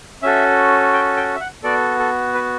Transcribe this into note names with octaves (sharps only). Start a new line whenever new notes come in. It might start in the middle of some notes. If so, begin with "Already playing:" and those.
C#4 F#4 A4 E5
G5
G5
E5
F#5
B3 F#4 A4 D5
A4
B4